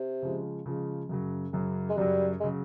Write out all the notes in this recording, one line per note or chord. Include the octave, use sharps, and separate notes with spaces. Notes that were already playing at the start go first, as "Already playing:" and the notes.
Already playing: C3
C#3 F3 G#3
C#3 F3 G#3
F#2 C#3 F#3
F#2 C#3 F#3
G#3
F#2 C#3 F#3 G3
G#3
C#3 F#3